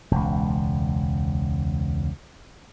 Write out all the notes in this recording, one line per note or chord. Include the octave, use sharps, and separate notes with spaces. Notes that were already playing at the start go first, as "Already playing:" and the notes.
E1 C#2